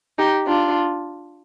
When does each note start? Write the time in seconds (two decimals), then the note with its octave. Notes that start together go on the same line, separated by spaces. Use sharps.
0.18 D#4 G4
0.47 D4 F4